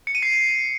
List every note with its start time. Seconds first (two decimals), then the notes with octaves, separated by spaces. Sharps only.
0.07 C#7
0.15 D#7
0.23 C7